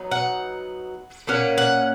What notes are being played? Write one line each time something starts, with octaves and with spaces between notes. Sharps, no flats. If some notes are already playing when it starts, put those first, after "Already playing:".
Already playing: F#3 B3 D#4
F#5
A#2 A#3 C#4 F#5
F#5